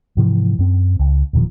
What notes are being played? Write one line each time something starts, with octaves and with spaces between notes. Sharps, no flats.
G#2 C3 E3 F3
F#2 C4
C#2
E1 A#2 D#3 F3